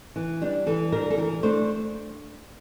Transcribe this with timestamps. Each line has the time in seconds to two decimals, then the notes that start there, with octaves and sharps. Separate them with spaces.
0.16 E3
0.42 G3 D4
0.66 E3 A4
0.92 G3 D4 A#4
1.10 A4
1.17 E3 A#4
1.43 A3 D4 C5